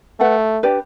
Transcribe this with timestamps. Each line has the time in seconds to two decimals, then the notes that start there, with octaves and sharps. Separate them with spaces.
0.20 A3 B4 F#5 A5
0.63 D4 G4 B4 D5